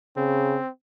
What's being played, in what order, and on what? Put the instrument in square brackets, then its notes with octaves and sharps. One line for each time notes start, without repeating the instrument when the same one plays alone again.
[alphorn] C#3 [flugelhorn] C4